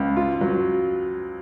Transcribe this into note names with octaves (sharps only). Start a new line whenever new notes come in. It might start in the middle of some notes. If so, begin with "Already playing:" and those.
Already playing: C#2
F4
F#3